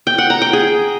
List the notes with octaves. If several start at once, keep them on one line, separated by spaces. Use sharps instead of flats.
G5
F#5
A#5
G5
G#4